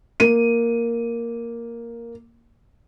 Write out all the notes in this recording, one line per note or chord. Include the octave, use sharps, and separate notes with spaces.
A#3 D#7